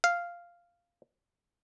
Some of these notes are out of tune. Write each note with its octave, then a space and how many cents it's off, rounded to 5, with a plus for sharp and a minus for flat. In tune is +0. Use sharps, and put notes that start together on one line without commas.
F5 -5